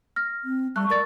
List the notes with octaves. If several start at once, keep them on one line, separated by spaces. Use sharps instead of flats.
F6 A#6
C4
G3 A3 C#6 F#6
A#4 D5 A6